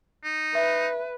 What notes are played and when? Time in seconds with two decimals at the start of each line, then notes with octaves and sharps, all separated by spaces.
0.24 D#4
0.55 B4 E5